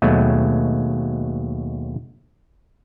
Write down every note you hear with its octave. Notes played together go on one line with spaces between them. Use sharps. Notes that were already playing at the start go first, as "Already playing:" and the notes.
D#2 B2 F#3 G#3 A3